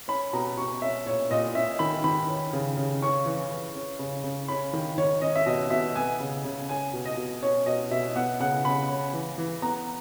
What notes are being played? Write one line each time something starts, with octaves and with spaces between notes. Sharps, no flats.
C#4 B5
B2 A#5
B2 C#6
C#4 E5
A#2 C#5
A#2 D#5
C#4 E5
D#3 B5
D#3 B5
C#4
C#3
C#3
C#4 C#6
E3
E3
C#4
C#3
C#3
C#4 B5
D#3
D#3 C#5
C#4 D#5
E5
B2 D#5
B2 E5
B3 G#5
C#3
C#3
C#4 G#5
B2
D#5
B2
C#4 C#5
B2 D#5
B2 E5
B3 F#5
C#3 F#5
C#3 B5
C#4
E3
E3
B3 A#5